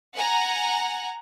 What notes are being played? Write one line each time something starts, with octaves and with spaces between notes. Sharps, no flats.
F#5 G#5 A#5